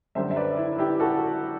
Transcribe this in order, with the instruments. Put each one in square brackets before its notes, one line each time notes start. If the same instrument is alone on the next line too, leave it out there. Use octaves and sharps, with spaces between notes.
[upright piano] F#2 D3 G3 C5 E5
E5
B4 D5
E4
E4 G4
F#4 A4